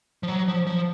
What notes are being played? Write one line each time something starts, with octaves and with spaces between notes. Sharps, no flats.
F3
F#3
F3
F3